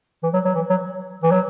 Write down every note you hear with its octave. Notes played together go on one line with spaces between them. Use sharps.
E3
F#3
F#3
E3
F#3
E3
F#3